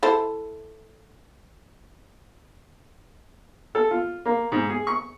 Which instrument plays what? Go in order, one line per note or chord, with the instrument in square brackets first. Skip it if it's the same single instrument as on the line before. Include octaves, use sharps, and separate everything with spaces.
[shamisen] E4 A4 C5
[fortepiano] A4
F4
A#3
G#2
G#4
C#6